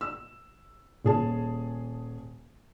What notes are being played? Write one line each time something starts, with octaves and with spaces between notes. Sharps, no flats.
E6
D#1 G#4 A5